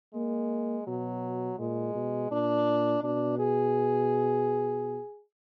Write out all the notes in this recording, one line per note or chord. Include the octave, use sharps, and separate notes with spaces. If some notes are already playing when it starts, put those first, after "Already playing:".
G#3 A#3
B2 F#3
A#2 G#3
B2
A#2 D4
B2 D4
G#4